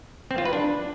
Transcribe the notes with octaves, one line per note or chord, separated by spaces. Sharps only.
C4
F4
B4
D4